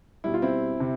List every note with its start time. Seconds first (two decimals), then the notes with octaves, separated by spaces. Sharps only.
0.24 B2 G3 E4
0.34 F4
0.42 C4 E4
0.80 C3